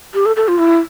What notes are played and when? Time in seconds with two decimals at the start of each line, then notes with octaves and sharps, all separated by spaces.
0.14 G4
0.26 A4
0.36 A4
0.48 F4
0.58 E4